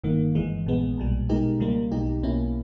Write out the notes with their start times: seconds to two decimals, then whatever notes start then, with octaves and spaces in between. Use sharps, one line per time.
0.04 G1 G2 D#3 A#3
0.35 G1 G2 E3 G#3
0.66 A#1 A#2 G#3 B3
0.97 B1 A#2 G3
1.29 B2 G#3 D#4 G4 A#4
1.60 C#2 C#3 G3 A#3
1.91 B1 B2 G#3 D#4 G4
2.23 B1 B2 A#3 C#4 E4